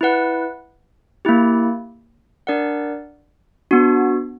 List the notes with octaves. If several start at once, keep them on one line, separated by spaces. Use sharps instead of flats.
E4 B4 F#5
A#3 E4 G4
D4 A#4 D5 F#5
B3 D4 F#4